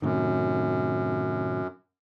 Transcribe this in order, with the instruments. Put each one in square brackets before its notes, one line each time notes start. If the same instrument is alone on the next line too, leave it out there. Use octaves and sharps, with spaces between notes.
[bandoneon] F#2 [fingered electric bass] A2 C3 D#3